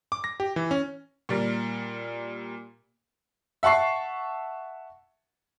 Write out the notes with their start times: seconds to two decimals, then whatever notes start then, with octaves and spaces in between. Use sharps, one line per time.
0.12 D6
0.24 A#6
0.40 G4
0.56 E3
0.71 C#4
1.29 A#2 G3 A#4
3.63 E5 F#5 A5 C#6 C7